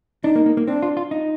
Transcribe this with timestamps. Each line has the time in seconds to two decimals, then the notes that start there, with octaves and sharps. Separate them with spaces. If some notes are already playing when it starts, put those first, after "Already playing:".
0.24 D4 D#4
0.36 A#3
0.46 A#3
0.57 A#3
0.67 C4 D4
0.82 F4
0.97 F4
1.11 D#4